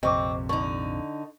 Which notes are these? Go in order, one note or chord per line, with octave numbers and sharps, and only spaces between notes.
A#1 F2 C3 C4 D#5 C#6 D6
D3 D#4 C#6